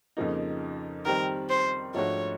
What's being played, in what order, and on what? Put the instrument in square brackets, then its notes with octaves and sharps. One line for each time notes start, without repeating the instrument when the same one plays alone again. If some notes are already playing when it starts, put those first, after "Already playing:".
[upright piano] F2 C#3 F3 A#3 D#4
[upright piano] D#3 G3 C4 [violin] A#4
[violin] C5
[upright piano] G#2 F3 A3 D4 F#4 [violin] C#5